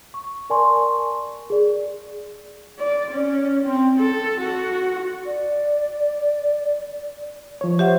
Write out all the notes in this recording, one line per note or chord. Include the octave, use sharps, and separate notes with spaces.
C#6
A#4 D5 G#5 A5 C6 C#6
G#4 D5
D5
C#4
C4
A4
F#4
D5
F3 C#5
G4 C5 E5 F#5